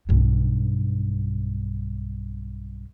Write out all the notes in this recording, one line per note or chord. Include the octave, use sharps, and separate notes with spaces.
B1 G2